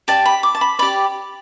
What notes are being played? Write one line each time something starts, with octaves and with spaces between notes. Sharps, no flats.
G4 D5 A5
B5
D6
A5
B5
G4 D5 B5